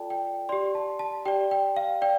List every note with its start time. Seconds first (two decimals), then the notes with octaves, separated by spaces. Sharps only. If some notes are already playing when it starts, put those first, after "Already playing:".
Already playing: F4 A4 D5 G5 A5
0.10 G5
0.49 G4 D5 C6
0.75 A5
0.99 A5
1.25 G4 D5 G5
1.51 G5
1.76 F5
2.02 D5 G5